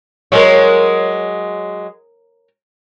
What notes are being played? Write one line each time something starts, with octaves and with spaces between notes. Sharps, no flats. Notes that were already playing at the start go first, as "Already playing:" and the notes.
F#3 G#3 A#4 B4 C#5